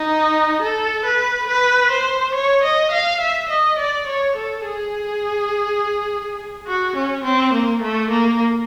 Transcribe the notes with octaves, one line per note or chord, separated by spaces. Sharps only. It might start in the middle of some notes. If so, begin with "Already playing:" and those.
Already playing: D#4
A4
B4
B4
C5
C#5
D#5
F5
E5
D#5
D5
C#5
A4
G#4
F#4
C#4
C4
A#3
A3
A#3